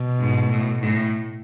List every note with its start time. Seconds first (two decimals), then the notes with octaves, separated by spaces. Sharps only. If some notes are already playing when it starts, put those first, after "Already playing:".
Already playing: B2
0.20 G#2
0.49 A2
0.79 A2